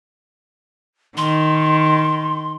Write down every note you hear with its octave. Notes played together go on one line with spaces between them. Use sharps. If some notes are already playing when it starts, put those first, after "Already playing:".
D#3 C6